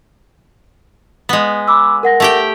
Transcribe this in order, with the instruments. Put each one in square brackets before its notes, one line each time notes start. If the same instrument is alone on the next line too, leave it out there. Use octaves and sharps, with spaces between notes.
[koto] G#3 B3
[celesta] B5 D6 E6
A#4 F#5 A#6
[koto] A3 G4 G5